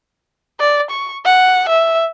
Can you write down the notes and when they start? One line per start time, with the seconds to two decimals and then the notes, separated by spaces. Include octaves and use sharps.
0.60 D5
0.90 C#6
1.25 F#5
1.69 E5